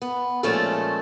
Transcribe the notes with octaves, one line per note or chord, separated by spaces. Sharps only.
B3
A#2 F3 G#3 A3 C#4 A4